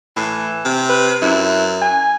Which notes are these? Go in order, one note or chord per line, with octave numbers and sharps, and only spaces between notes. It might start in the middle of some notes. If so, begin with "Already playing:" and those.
A2 E3
C3
B4
F#2 E4
G#5